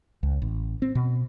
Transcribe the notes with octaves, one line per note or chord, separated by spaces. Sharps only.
C#2
A1
C4
B2